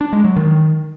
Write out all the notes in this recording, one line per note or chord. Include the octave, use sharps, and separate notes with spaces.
D4
G#3
F#3
D#3